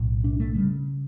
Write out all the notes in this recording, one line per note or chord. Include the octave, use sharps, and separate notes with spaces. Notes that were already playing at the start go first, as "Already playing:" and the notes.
Already playing: B1 A2
D4
A3
C#3 G3